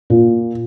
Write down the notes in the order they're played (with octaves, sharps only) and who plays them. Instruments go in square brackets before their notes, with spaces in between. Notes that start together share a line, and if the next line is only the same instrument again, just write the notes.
[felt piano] A#2